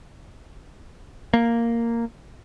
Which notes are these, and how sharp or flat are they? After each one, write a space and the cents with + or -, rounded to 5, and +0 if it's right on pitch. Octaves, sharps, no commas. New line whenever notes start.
A#3 -5